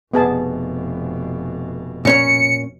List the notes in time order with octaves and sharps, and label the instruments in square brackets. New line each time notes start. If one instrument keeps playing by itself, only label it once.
[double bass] F1 B2 [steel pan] B3 G#4 A5
[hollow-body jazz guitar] A#2 C#4 C#5 [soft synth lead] C#7